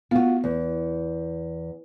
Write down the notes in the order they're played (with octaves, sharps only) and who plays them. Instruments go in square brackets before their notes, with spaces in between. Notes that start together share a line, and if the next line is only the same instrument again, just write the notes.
[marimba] B3 [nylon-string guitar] F4 F#4
[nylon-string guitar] E2